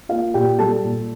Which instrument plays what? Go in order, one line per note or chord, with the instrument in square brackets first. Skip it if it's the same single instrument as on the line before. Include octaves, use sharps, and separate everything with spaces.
[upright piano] A#3 F4 F5
A#2 G4 G5
G3 A4 A5
A#2